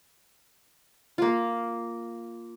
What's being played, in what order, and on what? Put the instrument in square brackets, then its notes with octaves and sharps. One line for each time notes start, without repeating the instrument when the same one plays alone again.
[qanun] A#3 F4